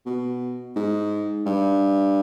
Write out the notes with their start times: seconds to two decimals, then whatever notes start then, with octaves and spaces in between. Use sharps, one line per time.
0.06 B2
0.76 G#2
1.46 G2